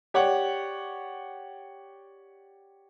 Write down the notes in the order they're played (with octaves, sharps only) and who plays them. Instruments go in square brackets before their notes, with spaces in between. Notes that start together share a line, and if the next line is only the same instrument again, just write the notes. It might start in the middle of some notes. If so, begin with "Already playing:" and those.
[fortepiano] G4 C#5 D5 F#5